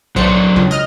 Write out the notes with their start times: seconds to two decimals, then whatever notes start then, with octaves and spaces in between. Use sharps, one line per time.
0.16 B1 F#3 D4 C5 C#7
0.56 C#2
0.71 D#5 F6